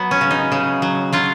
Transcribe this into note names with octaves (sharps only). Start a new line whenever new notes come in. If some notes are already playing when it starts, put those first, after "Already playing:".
Already playing: F#3 B3
C#4
C#3
D#4
C#3
F#3
F#3 F4